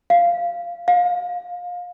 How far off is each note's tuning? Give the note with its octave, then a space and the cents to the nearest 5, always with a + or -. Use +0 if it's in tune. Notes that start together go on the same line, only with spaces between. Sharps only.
F5 -10
F5 +25